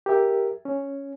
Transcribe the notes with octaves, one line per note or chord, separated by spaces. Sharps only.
G4 A#4 E5
C#4